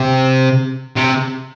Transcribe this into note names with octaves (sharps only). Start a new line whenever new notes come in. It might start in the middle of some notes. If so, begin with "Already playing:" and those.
Already playing: C3
C3